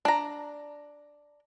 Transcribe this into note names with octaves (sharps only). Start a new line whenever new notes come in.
D4 A#5